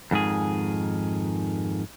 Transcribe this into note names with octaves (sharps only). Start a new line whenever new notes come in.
F2 G#2 D#3 G#4